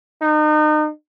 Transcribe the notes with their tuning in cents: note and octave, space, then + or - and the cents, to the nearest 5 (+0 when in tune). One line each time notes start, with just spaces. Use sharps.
D#4 -35